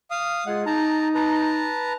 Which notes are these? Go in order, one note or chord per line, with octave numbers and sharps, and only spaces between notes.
F5 D#6
G#3 F4 G#4 F#5
D#4 A5 A#5
B4 A5 A#5